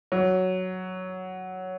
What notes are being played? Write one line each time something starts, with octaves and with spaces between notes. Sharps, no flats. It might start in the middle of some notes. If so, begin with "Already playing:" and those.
F#3